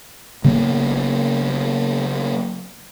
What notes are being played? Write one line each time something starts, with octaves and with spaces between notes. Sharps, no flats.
C#3 F#3 A#3 B3